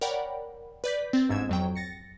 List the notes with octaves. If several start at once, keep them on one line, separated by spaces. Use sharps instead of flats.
A#4 C#5 D5 F#5 G5 B5
B4 D5 G6 B6
C4 A6
G1 G#2 E6 G#6 E7
F2 F#3 G5
A6 A#6 C#7